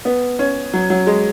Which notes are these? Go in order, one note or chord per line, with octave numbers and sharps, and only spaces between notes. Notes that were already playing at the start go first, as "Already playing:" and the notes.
B3
C#4
F#3
F#3
G#3